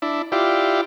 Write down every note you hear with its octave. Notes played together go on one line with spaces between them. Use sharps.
D4 E4
E4 F4 G4 D5